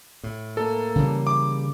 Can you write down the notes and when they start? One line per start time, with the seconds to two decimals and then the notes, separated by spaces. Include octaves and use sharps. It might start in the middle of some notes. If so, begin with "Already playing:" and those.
0.24 A2
0.57 A#3 A4
0.96 C#3 E3 G3
1.27 D6